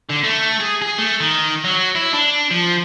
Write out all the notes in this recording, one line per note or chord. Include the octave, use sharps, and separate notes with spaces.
D3
A3
G#4
G#4
A3
D#3
F#3
E4
D4
F3